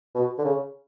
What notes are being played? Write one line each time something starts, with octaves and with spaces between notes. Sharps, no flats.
B2
D3
C#3